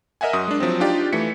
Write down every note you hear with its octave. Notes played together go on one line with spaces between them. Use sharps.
A#4 D#5 E5 F#5 G#5
F#2 F#4 D#6
G#3 D4
F3 F#3 C4
D4 D#4 F4 G4 D5 G5
E3 A3 B6 C#7